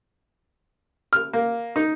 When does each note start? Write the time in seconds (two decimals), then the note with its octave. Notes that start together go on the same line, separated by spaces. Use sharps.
1.13 F6
1.33 A#3
1.76 D#4